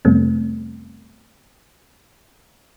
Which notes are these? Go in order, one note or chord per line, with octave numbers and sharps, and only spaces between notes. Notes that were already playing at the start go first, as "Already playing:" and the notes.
F2 C3 G3 A3 B3 C4